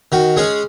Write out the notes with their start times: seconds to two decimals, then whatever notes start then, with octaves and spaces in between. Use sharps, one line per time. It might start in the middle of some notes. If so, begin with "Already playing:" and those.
0.12 D#3 F#4
0.36 G#3 C#4 G#4